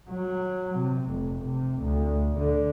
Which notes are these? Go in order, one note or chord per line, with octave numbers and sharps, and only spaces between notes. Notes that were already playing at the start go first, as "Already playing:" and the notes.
F#3
C3
F1
C3
D2
D3